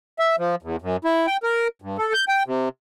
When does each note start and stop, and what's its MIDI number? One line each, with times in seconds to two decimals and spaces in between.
0.19 0.36 76
0.38 0.55 53
0.62 0.76 40
0.82 0.96 42
1.05 1.26 64
1.27 1.37 79
1.43 1.68 70
1.82 1.97 43
1.98 2.13 69
2.13 2.25 91
2.28 2.43 79
2.46 2.69 48